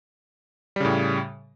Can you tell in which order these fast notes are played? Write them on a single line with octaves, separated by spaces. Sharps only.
G3 C#3 A2